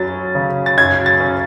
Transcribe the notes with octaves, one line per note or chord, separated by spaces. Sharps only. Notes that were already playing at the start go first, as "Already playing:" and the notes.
Already playing: F#2 F#3 C#4 A6
C#3
A6
F#2 G#6
A6
C#4